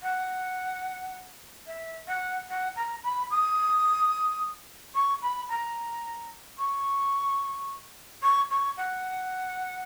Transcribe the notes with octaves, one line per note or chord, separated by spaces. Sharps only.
F#5
E5
F#5
F#5
A#5
B5
D#6
C#6
B5
A#5
C#6
C#6
C#6
F#5